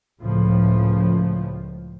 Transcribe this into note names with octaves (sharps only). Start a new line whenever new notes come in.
C#2 A2 C#3 F3